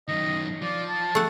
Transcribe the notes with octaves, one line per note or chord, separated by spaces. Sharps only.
F#2 D#3 D#5
F3 D5
A5
A3 F#5